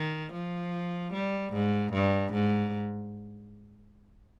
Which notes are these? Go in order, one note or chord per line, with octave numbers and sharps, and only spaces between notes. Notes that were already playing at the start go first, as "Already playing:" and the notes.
Already playing: D#3
F3
G3
G#2
G2
G#2